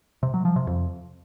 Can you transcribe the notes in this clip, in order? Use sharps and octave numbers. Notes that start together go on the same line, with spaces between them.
C3
F#3
F3
C3
F2